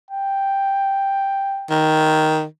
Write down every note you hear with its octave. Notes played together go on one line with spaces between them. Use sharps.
G5
D#3